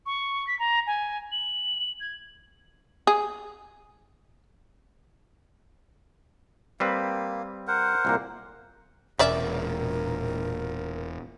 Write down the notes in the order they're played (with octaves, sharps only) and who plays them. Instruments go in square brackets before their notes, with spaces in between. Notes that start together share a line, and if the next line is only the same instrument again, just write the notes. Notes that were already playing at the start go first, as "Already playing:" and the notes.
[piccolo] C#6
B6
A#5
G#5
F#7
G#6
[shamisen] G#4
[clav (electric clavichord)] G3 C4 B4 [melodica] A#3
[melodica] A#4 C5 F#5
[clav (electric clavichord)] C2 A#2 A#3
[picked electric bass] E1 [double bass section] A#2 [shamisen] C#4 D5 E5 [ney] A#4